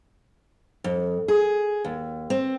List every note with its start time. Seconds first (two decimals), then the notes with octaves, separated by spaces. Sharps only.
0.84 F2
1.28 G#4
1.85 D#2
2.30 C4